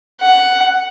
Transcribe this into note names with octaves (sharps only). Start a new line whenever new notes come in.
F#5